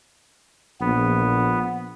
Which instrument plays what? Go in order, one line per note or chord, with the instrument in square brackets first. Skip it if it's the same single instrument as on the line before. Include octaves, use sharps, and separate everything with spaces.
[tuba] A#1 [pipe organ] B3